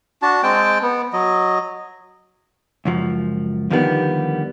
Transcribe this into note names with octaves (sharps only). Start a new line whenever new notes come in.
D4 F#4 A5
G#3 C4 G5 A5
B3
F#3 D#5
C#2 F#2 F3
D#2 D3 D#3 F3 G3 B3